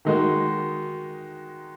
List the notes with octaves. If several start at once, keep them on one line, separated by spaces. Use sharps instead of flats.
D#3 G#3 D#4 F#4